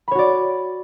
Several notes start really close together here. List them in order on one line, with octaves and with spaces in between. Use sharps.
B5 C#5 F#4 D5